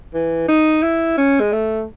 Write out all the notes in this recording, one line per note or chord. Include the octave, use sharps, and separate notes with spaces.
E3
D#4
E4
C#4
G#3
A3